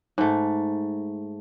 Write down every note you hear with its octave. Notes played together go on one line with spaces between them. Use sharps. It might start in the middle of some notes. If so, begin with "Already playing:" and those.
G#2 A3